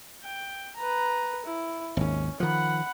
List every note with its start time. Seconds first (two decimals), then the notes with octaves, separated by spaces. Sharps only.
0.24 G5
0.76 B4 A#5
1.45 E4
1.97 G#1 D#2 C#4
2.40 D#3 F3 F#5 B5